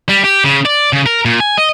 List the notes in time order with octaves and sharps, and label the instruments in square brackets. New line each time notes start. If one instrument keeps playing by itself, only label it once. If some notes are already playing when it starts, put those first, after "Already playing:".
[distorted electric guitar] G3
G4
C#3
D5
C#3
A#4
A#2
G#5
D#5